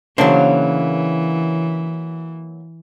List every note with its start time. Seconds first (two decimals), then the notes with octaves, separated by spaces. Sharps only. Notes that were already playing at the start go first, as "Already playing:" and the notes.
0.18 C#3 E3 F#3 A#3 D4 C5